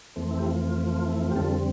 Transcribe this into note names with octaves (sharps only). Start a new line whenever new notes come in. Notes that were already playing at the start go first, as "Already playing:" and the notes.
F2 E3 A3 C4
E4
G4
F4
E4
F4
G4
F2 D3 G3 C4 F4 A4